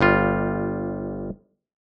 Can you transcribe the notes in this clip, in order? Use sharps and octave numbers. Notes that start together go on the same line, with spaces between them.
G1 G3 F4